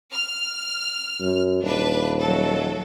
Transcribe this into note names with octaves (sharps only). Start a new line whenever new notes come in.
F6
F#2
D#1 D4 B4
F#3 A4